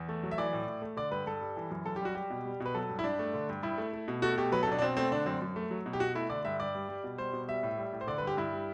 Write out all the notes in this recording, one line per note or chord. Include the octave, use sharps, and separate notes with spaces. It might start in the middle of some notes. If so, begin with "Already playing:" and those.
Already playing: E2
A3
F#3
E5
E3 D5
A2
A2
A3
D3 D5
G2 B4
G2 A4
G3
E3
F#2
F#2 A4
G4
G3 F#4
G3 G4
B2
G3
B2
B4
F#3 A4
G2
E4
G2 D4
A3
D3
G2
G2 E4
A3
A3
B2
A3 F#4
B2 G4
F#3 B4
A4
B2 D4
D4
B2 C4
A3 C4
D3 D4
F#2 C4
F#2
A3
F#3
B2
G4
B2 F#4
A3 E4
D3 D5
G2 E5
G2 D5
G3
G3
B2
G3 C5
B2
G3 E5
A2
G3
A2
C5
D3 D5
B4
G2
G4
G2 E4
G3